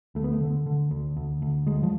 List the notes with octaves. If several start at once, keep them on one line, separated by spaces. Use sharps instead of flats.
D2 A3
B3
A3
D3
D3
D2
D2
D2
D2 G#3
F3